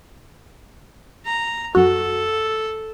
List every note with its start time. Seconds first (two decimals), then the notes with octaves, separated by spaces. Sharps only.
1.25 A#5
1.75 F#2 F#4 A4